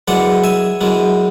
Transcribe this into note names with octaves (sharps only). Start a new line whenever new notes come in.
F#2 E3 G#3 B3 D5 F#5
E5 G#5
F#2 E3 G#3 B3